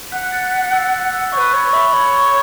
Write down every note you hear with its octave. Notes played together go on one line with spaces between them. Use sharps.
F#5 F#6 B6
A6 C#7
F#6 B6
E6 A6
F#6
E6
B4 C#5 C#6
C#5 B5
C#6
E5 B5
C#5 B5
C#6